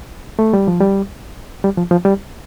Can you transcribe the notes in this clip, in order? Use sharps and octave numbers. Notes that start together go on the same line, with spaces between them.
A3
G3
F3
G3
G3
F3
F3
G3